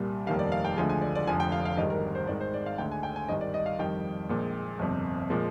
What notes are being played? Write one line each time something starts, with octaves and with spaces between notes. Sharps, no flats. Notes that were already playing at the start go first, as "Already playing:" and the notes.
Already playing: C2 A#2 G3
F1 D#2 D#3 G3 F5
D5
F5
G5
D2 D3 F3 G#3 G#5
G#5
D5
D5
F1 F2 D3 F3 G#5
G5
F5
F5
G#1 G#2 D#3 G3 D#5
A#4
C5
G#1 G#2 D#3 G#3 D5
C5
D5
F5
D2 D3 G#3 G5
G#5
G5
G#5
G#1 G2 D#3 G3 D#5
D5
D#5
F5
F2 D#3 G3 G5
A#1 A#2 G#3
G1 F2 C3
A#2 F3 G#3